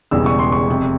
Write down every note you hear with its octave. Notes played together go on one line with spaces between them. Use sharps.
E1 E2 C#3 E3 G3 E6
C#6
C6
C#6
F1 F2 C3